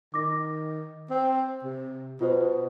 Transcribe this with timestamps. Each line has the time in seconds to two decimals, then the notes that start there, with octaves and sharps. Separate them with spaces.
0.14 D#3 D6 A#6
1.10 C4
1.64 C3
2.21 B2 F4 C5